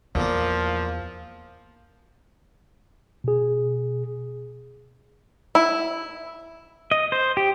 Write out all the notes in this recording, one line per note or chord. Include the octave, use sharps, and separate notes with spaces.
E2 A#2 F3 A#3
B2 G#4
E4
D#5
C5
G4